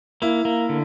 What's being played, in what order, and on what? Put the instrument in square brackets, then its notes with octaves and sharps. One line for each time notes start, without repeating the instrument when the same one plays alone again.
[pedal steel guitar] A#3 [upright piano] E4
[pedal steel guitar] A#3
D3